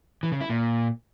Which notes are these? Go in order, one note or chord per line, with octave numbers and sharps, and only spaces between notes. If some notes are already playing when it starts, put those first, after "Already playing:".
E3
C#3
E4
A#2